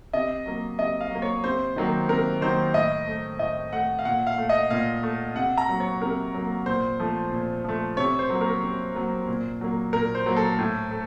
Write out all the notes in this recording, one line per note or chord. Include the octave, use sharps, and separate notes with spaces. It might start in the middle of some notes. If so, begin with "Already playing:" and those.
C3 D#5
F#3 A#3
C3 D#5
F5
F#3 A#3
C#5
C3 C5
D#3 F#3 A#3
C3 A#4
D#3 F#3 A#3 C5
A2 D#5
A3
A2 D#5
A3 F#5
F5
A#2 F#5
F5
A3
D#5
A#2 F5
A3
C3 F#5
A#5
F#3 A#3
C#5
C3 A#4
F#3 A#3
A#2 C5
F3 A3
A#2
F3 A3
C3 C#5
C5
F#3 A#3
A#4
C3
F#3 A#3
A#2
F#3 A#3
A#2 A#4
C5
F#3 A#3
A4
A2
A3